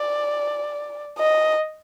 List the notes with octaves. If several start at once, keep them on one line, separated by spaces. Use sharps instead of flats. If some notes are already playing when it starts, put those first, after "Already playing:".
Already playing: D5
D#5